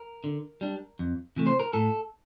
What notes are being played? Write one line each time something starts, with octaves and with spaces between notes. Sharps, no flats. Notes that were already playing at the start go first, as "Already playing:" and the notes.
Already playing: A#4
D3
G3 D4
F2
C3 E3 A3
C5
A#4
A2 A4